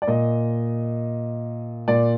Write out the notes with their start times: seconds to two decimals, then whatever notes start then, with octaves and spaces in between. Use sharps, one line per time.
0.02 D5
0.07 A#2 D#5
1.88 A#2 D5